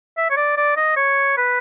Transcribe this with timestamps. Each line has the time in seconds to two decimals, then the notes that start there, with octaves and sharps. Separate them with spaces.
0.17 E5
0.30 C#5
0.37 D5
0.57 D5
0.76 D#5
0.96 C#5
1.37 B4